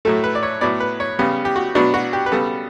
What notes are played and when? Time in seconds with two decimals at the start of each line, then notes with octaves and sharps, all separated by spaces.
0.05 A2 F#3 A3 A4
0.24 B4
0.35 D5
0.43 C#5
0.61 A2 F#3 B3 D5
0.80 B4
1.00 C#5
1.19 C#3 G3 B3
1.45 G4
1.56 F#4
1.75 B2 F#3 B3 D4
1.94 F#4
2.13 G4
2.26 B4
2.32 C#3 G3 B3 A4